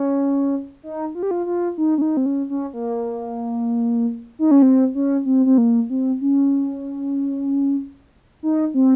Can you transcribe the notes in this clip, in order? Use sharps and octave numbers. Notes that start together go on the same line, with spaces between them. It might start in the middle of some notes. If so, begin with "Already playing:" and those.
Already playing: C#4
D#4
F4
G4
F4
F4
D#4
C#4
D#4
C4
C#4
C#4
A#3
D#4
C#4
C4
C#4
C4
C4
A#3
C4
C#4
D#4
C4